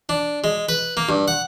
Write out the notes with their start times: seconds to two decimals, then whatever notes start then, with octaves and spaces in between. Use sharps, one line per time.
0.09 D4
0.44 G#3
0.69 B4
0.97 A#3
1.09 G2
1.28 F#5